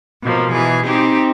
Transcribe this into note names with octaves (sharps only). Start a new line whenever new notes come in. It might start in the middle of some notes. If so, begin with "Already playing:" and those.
B2 F3 A#3
B2 E3 G#4
C4 D#4 G4